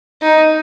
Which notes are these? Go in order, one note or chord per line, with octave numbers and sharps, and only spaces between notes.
D#4